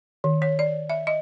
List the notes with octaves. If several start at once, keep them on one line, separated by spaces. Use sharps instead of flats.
D#3
C#5
D5
E5
D#5